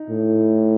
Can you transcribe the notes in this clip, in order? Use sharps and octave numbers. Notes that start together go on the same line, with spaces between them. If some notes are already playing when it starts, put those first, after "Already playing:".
Already playing: D#4
A2